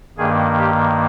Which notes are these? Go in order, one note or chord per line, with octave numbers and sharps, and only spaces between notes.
G2 D#3 A#3 G#4
G4